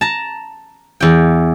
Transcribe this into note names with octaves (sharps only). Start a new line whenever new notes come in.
A5 A#5
E2 G5